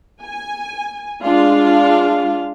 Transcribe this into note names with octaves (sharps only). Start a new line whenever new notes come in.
G#5
G#3 D4 F4 F5